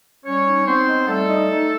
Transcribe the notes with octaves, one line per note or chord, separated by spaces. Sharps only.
G3 C#4 C#5
D#4
B3 C4 C5
D#4
G3 A3 A4
D#4
D#4